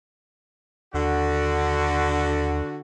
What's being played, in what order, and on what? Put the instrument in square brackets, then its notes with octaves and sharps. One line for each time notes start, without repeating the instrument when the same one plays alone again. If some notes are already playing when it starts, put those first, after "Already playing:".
[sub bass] D#2 [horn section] D3 F#4